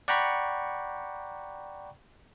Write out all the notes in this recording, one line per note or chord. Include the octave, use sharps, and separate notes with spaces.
D5 F#5 G5 A#5 B5 C#6